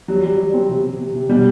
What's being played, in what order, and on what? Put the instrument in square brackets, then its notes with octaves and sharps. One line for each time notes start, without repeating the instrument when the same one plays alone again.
[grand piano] F#3 [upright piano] G3
[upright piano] G3
G3
C4
C3
C3
C3
C3
[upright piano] B2 [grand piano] G3